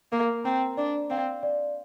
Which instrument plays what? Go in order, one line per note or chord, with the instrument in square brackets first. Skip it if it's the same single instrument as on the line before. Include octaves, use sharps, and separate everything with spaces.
[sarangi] A#3 [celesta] A#4
[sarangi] C4 [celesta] A#5
[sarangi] D4 [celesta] D5
[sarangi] C4 [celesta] F5
[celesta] D5